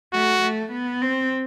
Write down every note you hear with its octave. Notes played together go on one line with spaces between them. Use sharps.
A3 F#4
A3
B3
C4